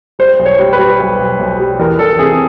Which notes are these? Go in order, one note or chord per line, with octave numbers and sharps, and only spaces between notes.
G3 C5
B1
C#5
G3
B4
G3
B1
B1
B1
G3
E2 A#4
E2 A4
C3 G#4